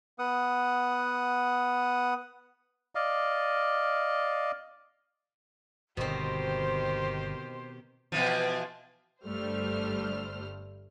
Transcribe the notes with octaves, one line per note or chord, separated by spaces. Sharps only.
B3 F#5 D#6
D5 D#5 F5
G1 B2 D#3 C4 G4 C5
B2 E3 F3
G1 G2 G3 A3 C5 F6